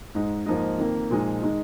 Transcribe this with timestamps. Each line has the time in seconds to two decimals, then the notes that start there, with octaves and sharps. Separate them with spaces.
0.15 G#2 G#3 D#4
0.46 G#2 F3 A#3 D#4
0.78 F2 D#3 A#3
1.10 A#2 F3 G#3 D#4
1.42 D#3 G#3 D#4